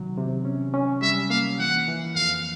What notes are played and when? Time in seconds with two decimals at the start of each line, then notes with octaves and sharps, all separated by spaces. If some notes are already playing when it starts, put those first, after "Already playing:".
Already playing: C3 D#3 F#3
0.17 C3
0.45 C#4
0.74 C#4
1.02 G3 E5
1.30 A#3 F5
1.59 E3 F#5
1.88 E3
2.16 F2 F5